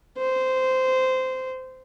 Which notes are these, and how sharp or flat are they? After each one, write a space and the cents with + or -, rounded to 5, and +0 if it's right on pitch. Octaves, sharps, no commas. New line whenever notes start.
C5 -15